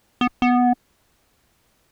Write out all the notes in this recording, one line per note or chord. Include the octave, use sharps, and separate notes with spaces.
B3
B3